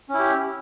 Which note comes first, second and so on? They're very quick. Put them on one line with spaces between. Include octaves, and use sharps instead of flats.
C#4 E4 G4